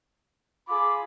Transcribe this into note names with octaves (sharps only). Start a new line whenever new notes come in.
F4 G#4 B5 D6